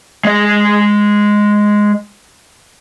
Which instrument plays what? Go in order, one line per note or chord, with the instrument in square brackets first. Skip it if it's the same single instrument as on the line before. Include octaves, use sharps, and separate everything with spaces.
[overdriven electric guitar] G#3 D#5